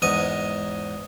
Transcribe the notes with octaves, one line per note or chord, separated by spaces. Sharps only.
E2 G#2 D#5 G#5